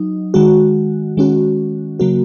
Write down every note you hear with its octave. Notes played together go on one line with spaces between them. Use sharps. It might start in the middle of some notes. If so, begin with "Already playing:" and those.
Already playing: F#3 D#4
D#3 G#3 F#4
D#3 G#3 C#4 F#4
C#3 F#3 A#3 F#4